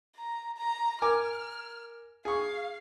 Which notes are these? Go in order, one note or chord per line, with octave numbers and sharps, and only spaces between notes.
A#5
A#5
A#4 G#5 D6 F6
G#4 F5 C#6